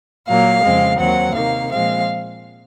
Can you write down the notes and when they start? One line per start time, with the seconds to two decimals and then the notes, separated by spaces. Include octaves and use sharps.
0.28 A#2 F#3 A#3 F5
0.63 F2 C#3 G#3 C4
0.99 D#2 D#3 F#3 C4 F#5
1.35 C3 D#3 A#3 F5
1.71 A#2 F3 G#3 C4 F5